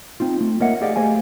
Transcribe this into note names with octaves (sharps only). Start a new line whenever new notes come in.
C4 D#4 F4
A3
A#3 A#4 C#5 D#5 E5 F#5
G4 G#4 D5 D#5 F5
A3 G4 G#4 C5 F5 G#5